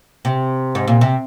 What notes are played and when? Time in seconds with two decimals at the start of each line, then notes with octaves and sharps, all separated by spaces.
0.25 C3
0.75 G#2
0.88 A#2
1.01 C3